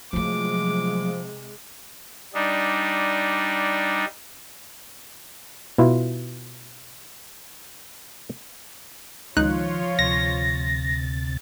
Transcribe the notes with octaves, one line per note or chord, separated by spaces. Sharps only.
C3 F3 F#3 G#3 A3 D6
G3 D4 D#4
B2 E4 F4
C#2 D#3 F3 D#4 F4 C#5 F#6
D2 C3 A6 A#6